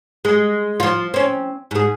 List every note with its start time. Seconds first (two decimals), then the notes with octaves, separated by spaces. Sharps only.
0.25 G#3
0.80 F3 F4
1.14 C4 C#4
1.71 G#2 G#4